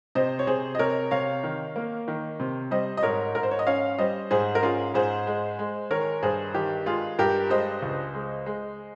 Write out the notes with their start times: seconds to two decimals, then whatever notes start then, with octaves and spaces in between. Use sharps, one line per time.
0.15 C3 C5 D#5
0.39 C#5
0.47 C3 G#4 C5
0.75 D#5
0.79 C3 A#4 C#5
1.11 C3 C#5 F5
1.43 D#3
1.76 A#3
2.08 D#3
2.40 C3
2.71 G3 C5 D#5
2.97 D#5
3.03 G#2 A#4 C#5
3.35 G#2 A#4
3.43 C5
3.51 C#5
3.59 D#5
3.67 C#4 C#5 F5
3.98 G3 C5 D#5
4.31 G#2 G#4 C5
4.55 A#4
4.63 C#4 F4 G#4
4.94 G#2 G#4 C5
5.27 G#3
5.59 G#3
5.91 D#3 A#4 C#5
6.22 G2 G#4 C5
6.54 D#3 G4
6.86 G#3 F4 G#4
7.19 G2 G4 A#4
7.50 G#3 C5 D#5
7.82 C#2
8.14 G#3
8.46 G#3